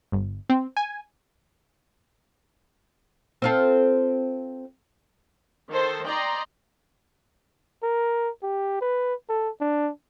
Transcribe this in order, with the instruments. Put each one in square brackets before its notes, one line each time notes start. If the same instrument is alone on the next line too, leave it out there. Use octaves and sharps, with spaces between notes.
[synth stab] G1
C4
G#5
[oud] C4 F4 A4
[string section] D#3 A4 C5
D5 D#5 G5 A#5 C6
[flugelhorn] A#4
G4
B4
A4
D4